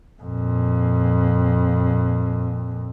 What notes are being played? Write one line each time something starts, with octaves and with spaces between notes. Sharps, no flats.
F2 A#2